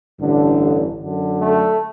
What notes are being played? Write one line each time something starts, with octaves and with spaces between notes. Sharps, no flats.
A1 G2 D3
F#2 D3
A3